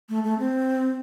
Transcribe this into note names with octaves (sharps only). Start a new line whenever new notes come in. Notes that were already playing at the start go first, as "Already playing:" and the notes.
A3
A3
C4